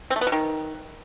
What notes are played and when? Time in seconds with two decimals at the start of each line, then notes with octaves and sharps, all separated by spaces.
0.10 C4
0.16 A3
0.21 B3
0.27 B2
0.32 D#3